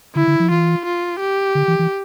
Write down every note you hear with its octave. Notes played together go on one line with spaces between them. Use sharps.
D3 E4
D3
F3
E3 F4
F4
G4
D3
E3
E3